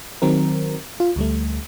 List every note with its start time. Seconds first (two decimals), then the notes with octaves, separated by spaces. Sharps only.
0.22 D#3 F#3 C4 A#4
1.00 F4
1.16 D2 G3 A3